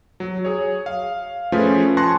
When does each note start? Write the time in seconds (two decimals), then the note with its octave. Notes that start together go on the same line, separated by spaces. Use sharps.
0.20 F#3
0.45 G#4 C#5
0.86 F5
1.52 F3 A3 C#4 F4 G#4 B4
1.97 G#5 A5 C6 C#6 F#6 A#6